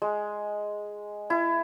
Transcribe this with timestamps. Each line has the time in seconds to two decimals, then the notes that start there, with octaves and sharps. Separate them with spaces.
0.02 G#3
1.30 E4